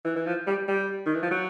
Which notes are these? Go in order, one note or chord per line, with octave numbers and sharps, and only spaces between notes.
E3
E3
F3
G3
G3
D#3
E3
F3
F#3